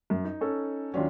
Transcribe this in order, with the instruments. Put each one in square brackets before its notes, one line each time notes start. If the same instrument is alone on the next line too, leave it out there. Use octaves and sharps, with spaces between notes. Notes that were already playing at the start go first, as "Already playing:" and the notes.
[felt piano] F#2
D#4
[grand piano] C#4 A4
[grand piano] D#2 F#3 [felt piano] C#4 D4 F4